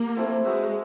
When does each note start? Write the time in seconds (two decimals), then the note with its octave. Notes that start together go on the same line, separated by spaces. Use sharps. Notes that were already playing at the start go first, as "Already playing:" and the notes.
Already playing: A#3 G4
0.16 F3 A3 C4 E4
0.44 G#3 D#4 F#4 B4 E5